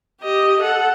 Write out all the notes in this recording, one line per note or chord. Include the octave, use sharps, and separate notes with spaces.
G4 D#5
A4 F#5